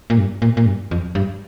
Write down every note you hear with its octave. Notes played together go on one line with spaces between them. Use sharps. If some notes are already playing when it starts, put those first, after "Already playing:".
A#2
G2
A#2
A#2
G2
F2
G2